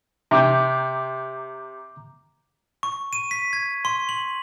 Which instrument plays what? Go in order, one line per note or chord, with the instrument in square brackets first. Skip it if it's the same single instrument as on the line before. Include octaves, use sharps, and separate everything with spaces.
[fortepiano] C3 [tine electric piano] A#5 D6 G6
[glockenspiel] C#6
D#7
B6
G#6
C6
F#7